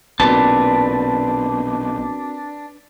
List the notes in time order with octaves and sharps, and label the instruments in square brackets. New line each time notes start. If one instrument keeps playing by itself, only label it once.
[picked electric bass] B1 A#2 [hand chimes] C4 F#4 A#4 [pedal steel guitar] D4 [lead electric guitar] B4 A5